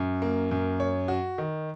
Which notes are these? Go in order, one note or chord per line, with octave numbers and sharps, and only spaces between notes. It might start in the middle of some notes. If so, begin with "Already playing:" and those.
Already playing: F#2
A#3
F#2
C#5
F#4
D#3